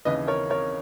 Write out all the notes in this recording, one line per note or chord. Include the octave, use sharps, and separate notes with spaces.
D#2 C#3 E3 B4 D#5
A#4 C#5
A#4 C#5